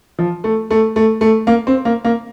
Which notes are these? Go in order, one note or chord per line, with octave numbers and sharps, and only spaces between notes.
F3
A3
A3
A3
A3
A#3
C4
A#3
A#3